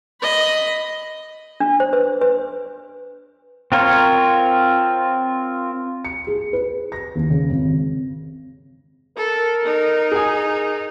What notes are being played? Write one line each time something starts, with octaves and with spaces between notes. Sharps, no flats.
D#5 B5
D4
C5
B4
B4
C4 F4 A#4 C#5
C#7
G#4
B4
A#6
D#2
C#3
G#1
A4 A#4
D#4
G#4 G#5